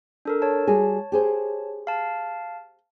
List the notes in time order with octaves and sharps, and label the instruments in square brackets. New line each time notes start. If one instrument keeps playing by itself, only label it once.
[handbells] D4 A4 A#4
C#5 A5
[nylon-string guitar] G3 F#4 G#4
G4 G#4 C5
[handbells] F5 A5